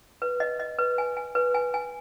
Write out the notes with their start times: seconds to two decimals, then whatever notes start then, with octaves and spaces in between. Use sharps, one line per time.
0.22 B4
0.40 D#5
0.60 D#5
0.78 B4
0.98 G#5
1.17 G#5
1.35 B4
1.54 G#5
1.74 G#5